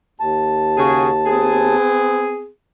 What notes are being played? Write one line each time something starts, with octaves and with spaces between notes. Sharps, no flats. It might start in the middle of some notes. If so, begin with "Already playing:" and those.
D#2 A5
C#3 F#4 G#4
B3 C4 G#4